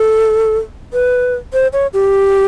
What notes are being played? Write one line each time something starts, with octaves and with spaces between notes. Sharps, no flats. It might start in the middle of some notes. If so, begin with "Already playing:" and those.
Already playing: A4
B4
C5
C#5
G4